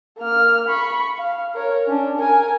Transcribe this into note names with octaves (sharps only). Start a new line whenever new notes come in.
A#3 F6
B5 C#6
F5
A#4 C#5
C#4 D4
A#4 G#5